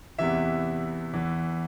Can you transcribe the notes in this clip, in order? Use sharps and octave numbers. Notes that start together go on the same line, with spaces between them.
E2 C3 E3 E5
E2 E3